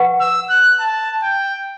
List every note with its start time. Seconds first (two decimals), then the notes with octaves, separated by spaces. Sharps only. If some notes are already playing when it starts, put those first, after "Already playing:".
Already playing: B4 F#5 C#6
0.21 E6
0.50 F#6
0.80 A5
1.23 G5